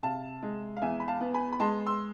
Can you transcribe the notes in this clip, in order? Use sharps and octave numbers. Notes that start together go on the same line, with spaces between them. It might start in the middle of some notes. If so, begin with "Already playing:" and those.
C3 F5 A5
G#3
F5
E2 E5 G#5
B5
F5 A5
B3
G#5 B5
B5
G#3 A5 C6
C6 E6